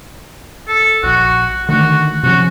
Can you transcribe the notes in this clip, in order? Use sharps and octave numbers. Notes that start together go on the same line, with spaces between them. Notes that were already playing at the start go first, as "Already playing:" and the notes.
A4
A#1 F#4
D3 D#3 A3 F#4
C3 F3 C#4 F#4